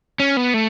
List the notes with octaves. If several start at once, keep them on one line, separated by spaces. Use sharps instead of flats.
C#4
B3
A3